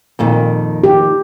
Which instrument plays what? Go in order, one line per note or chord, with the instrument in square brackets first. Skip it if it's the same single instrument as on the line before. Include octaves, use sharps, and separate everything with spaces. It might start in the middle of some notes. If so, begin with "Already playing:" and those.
[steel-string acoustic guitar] F2 A#2 D#3
[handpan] G4